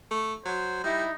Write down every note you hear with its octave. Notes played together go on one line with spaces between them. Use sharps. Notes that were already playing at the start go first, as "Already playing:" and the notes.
A3
F#3 C5
G3 D#4 E4